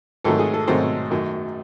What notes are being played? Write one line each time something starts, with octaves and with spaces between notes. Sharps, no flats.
G#2 D#3 F#3 A3 A4
G#4
A4
G#2 D#3 F#3 A3 C5
F#2 D#3 A3